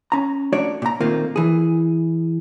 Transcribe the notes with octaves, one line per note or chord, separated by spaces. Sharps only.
C#4 A#5
A3 D4 F#4 C#5 D5
A#2 A#5
A#2 D#3 A3 A#3 C4 F4
E3 G#4